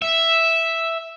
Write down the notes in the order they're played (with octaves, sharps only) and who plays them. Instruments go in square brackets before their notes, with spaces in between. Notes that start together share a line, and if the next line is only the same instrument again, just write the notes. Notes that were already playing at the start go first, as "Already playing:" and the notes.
[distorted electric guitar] E5